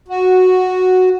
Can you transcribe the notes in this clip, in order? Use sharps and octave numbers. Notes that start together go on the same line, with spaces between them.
F#4